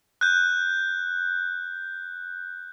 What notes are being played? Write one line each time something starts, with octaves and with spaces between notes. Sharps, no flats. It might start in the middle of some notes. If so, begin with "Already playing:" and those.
F#6 G6